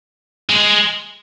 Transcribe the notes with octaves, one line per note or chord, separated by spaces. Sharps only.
G#3